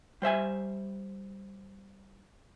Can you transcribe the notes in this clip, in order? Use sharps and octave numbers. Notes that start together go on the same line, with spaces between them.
G3 C5 E5 G#5